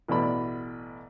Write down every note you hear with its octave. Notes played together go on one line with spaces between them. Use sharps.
A1 B2 D5 B5